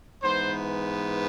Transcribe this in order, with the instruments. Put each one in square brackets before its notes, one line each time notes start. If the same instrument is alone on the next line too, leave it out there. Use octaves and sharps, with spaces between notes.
[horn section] G#2 E3 B3 C5